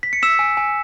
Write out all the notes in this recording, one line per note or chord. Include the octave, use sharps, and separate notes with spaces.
B6
C#7
E6 B6 E7
G#5
G#5